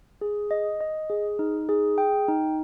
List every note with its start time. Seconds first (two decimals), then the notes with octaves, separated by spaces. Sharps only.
0.21 G#4
0.51 D#5
0.80 D#5
1.10 G#4
1.39 D#4
1.69 G#4
1.98 G5
2.28 D#4